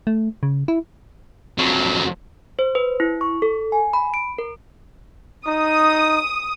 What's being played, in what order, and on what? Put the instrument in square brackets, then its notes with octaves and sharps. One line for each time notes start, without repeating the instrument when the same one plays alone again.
[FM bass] A3
C#3
E4
[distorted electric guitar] F2 F#3
[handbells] C5
B4
E4
C#6
A4
G#5
B5
D7
A#4
[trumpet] D#4 [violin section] D#6